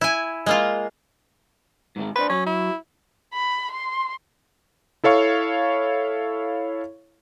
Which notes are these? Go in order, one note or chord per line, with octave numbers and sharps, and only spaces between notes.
E4 G#5
G#3 A#3 F4
G#2 D#3 G#3
D4 B4 C5
F#3 C#4
E4
B5
C6
E4 A4 C#5 F5 C#6